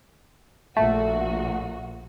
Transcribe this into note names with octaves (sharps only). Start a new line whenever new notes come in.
A#1 A#2 A3 F#4